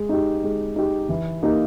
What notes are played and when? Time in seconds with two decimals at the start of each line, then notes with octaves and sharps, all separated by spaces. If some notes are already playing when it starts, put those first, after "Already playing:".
Already playing: G#3
0.09 D#4 G4
0.44 G#3
0.76 D#4 G4
1.09 E3
1.43 A#3 D#4 G4 A#4